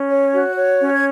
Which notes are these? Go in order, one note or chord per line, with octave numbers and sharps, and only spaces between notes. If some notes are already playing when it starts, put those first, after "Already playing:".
Already playing: C#4
C#5
F#4
C#5
C#4
G#6